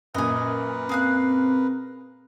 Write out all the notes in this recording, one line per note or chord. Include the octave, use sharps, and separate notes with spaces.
F#2 A#2 A#4 B4 D#5 G#5
C4 G#4 F5 F#6